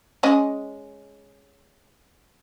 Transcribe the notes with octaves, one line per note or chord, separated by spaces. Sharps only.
G#3 C#4 D#5